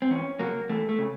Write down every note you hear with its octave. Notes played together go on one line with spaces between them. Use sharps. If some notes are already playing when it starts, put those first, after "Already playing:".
C4
E2 C#4
C#3 F#3 A#3
E2 A3
A3
C#3